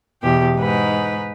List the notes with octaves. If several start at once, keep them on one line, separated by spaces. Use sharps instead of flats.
E2 B2 G4
G#2 D#4 B4